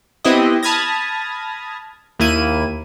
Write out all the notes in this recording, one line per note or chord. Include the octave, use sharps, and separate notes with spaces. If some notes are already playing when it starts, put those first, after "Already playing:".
B3 C4 E4 G4 D#5
A5 B5 D#6 F6 G#6 A#6
D#2 A#3 E4 D#7